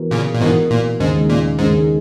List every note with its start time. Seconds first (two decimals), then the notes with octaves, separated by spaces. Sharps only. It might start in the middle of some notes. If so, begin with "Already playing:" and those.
Already playing: E3 B3 F#4 A#4
0.11 A#2 C#3
0.34 A#2
0.41 G#2 B2 E3 B3 F#4 A#4
0.71 A#2
1.00 D#2 G#2 C#3 G#3 D#4 G#4
1.29 A#2
1.59 D#2 G#2 C#3 G#3 D#4 G#4